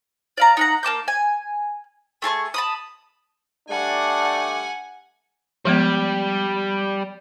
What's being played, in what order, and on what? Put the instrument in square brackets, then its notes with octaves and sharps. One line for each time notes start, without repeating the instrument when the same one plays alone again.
[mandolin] D5 F5 A#5
D#4 F#5 A#5
A#3 A5 D6 G6
G#5
A3 G#4 A5 C#6
A5 B5 D#6
[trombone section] G3 A3 D4 [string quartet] F#5 G#5
[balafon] F3 G#3 B3 [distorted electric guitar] G3